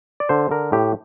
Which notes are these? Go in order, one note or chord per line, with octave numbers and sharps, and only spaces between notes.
D5
D3 C5
D3 A#4
A2 G4